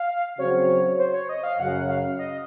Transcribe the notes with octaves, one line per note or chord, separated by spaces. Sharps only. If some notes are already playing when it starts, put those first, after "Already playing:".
Already playing: F5
C#3 F#3 C4 F#4 C5 C#5
C5
C#5
D#5
F5
F#2 C#3 F#3 F#5
F5
D#5